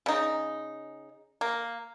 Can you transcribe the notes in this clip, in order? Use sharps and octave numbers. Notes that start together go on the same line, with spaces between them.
C#3 D#4
A#3